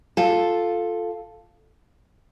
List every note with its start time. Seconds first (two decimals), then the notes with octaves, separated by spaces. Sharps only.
0.17 F4 A4